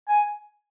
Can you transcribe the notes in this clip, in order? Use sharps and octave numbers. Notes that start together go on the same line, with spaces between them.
G#5